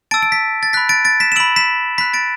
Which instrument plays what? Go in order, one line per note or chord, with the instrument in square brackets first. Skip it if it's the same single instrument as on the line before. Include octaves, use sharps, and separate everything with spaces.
[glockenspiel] A5 E6 A6 D7
D7
B6
A6
B5 F#6 B6
A6 D7
A6 D7
B6 E7
E7
B5 E6 D7 F#7
B6 E7
B5 F#6 B6
A6 D7